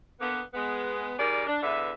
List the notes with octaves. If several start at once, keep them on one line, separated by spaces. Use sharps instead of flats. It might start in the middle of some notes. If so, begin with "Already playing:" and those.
D3 A#3 B3
G#3 B3
D#3 G3 G#4 A#4 D5
D4
E2 D3 B4 E5